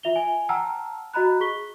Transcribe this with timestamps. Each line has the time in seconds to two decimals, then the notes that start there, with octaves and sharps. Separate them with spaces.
0.03 F4 E5 F7 G7
0.16 G#5
0.49 F#5 G5 A5 A#5 E6 F6
1.14 F#4 D#5 A#5 B5 F#6
1.40 G#4 C#6 B6 G7